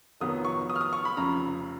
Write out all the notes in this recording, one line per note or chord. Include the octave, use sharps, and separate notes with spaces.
F1 F2 D#3 F#3 B3 D#6
C#6
D#6
F6
D#6
C#6
B5
F1 F2 C#3 A#5